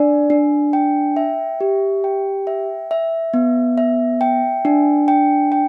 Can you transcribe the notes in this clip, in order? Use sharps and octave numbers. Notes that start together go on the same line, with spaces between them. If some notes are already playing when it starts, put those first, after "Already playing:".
Already playing: D4 D5
D4
G5
E5
G4
G5
E5
E5
B3
E5
G5
D4
G5
G5